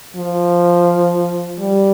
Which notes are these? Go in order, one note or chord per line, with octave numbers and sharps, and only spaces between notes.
F3
G3